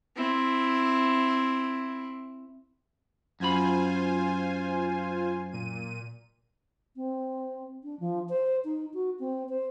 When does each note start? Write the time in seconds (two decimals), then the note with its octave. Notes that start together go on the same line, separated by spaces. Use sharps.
0.16 C4 E4
3.40 F#2 F4 C5 G#5 B5
5.52 A#2 D#7
6.96 C4
7.84 D4
8.00 F3
8.29 C5
8.65 D#4
8.94 F#4
9.20 C4
9.49 C5